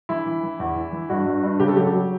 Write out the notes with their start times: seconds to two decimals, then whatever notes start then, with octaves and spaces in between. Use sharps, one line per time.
0.09 E3 E4
0.26 E3
0.43 E3
0.60 E2
0.76 E3
0.93 E3
1.09 G2 F#4
1.26 G2
1.43 G2
1.60 C#3 G4
1.68 A4
1.76 F#3 G4
1.94 F#3